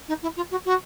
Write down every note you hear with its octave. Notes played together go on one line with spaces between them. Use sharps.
D#4
E4
F4
F#4
F#4